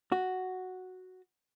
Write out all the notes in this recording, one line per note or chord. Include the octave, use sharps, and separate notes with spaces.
F#4